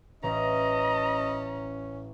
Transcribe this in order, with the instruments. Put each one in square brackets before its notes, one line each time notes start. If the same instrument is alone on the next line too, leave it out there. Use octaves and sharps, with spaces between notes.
[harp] A1 A#6 [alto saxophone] C#4 [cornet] D#5 [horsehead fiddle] A#5